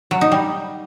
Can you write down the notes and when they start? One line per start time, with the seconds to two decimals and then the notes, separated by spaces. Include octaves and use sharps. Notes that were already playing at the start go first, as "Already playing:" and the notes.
0.11 F#3
0.21 D#4
0.32 G3